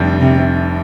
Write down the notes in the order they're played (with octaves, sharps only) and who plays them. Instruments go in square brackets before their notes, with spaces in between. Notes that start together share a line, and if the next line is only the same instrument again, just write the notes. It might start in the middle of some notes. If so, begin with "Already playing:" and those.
Already playing: [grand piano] F1 F2 D3 G3
[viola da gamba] C3